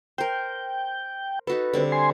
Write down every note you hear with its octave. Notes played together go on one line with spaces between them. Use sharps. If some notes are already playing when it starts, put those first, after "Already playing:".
A#4 C5 G5
D#4 F#4 A4 B4
D3 G3 C4
G#5 C6